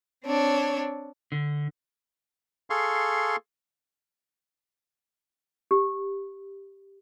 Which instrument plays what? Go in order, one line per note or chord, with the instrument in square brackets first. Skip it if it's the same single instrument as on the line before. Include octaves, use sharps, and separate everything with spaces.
[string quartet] C4 D4 C#5
[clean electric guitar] D3
[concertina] G#4 A4 F5 C6 C#6
[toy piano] G4